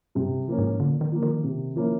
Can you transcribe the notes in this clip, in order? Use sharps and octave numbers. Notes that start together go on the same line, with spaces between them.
G2 C3
F3 A#3 C#4
G#2
A#2 D3
D#3
F3 A#3
D#3
C3
F3 A#3 C#4 E4